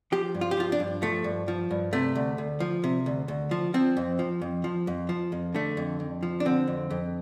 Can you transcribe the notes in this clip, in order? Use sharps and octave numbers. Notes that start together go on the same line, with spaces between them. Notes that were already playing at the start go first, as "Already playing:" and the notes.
F3 G4
G2
F4
G4
F3 F4
D4
G2
F3 A3
G2
F3
G2
C3 A3
D2
D2
F3
C3
D2
D2
F3
F3 C4
F2
F3
F2
F3
F2
F3
F2
D3 A3
F2
F2
F3
D4
D3 C4
F2
F2